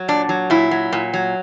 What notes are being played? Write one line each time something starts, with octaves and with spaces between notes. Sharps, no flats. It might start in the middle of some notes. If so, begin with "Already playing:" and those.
Already playing: F#3
A#2 D4
F#3
A#2 E4
F#3
A#2
F#3